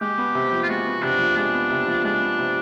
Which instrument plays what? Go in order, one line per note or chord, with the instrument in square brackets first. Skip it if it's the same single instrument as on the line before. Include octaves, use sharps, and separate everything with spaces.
[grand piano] G#3 [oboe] G4
[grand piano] B3
C3
F3
[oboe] F4
[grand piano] G#3 [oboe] F#4
[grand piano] B3
[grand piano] C3 [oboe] D4
[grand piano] F3
[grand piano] G#3 [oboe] D4
[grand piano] B3
C3
F3
[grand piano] G#3 [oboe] D4
[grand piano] B3
C3